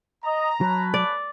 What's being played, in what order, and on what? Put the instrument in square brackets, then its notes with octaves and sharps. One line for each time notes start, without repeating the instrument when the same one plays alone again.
[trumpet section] D#5 [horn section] A#5
[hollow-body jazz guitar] F#3 [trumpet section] C#4 B4 A5
[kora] D5